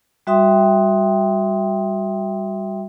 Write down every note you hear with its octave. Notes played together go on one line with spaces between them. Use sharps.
G3 F#4 E5 G5 C6 D#6